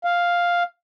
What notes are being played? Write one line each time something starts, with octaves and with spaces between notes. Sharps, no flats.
F5